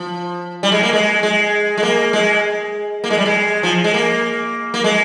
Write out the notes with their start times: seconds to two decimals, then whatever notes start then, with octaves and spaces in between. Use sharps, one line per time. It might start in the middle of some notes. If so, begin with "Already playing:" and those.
Already playing: F3
0.63 G3
0.72 G#3
0.83 A#3
0.93 G#3
1.23 G#3
1.77 G#3
1.83 A#3
2.13 G#3
3.04 A#3
3.10 G#3
3.18 G3
3.26 G#3
3.63 F3
3.84 G#3
3.94 A#3
4.74 A#3
4.84 G#3